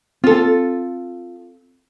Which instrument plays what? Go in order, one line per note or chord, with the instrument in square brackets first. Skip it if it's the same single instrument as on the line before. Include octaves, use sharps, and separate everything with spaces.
[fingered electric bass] C4 [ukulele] F4 A4